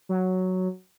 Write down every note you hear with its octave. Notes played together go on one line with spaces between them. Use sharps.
F#3